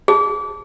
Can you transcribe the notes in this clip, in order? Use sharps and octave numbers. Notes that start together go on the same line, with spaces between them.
G#4